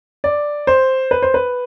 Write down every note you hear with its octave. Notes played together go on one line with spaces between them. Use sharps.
D5
C5
B4
C5
B4